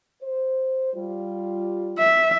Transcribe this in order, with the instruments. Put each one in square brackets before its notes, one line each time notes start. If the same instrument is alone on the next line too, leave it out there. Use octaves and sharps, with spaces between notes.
[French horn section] C5
G3 F4
[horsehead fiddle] E5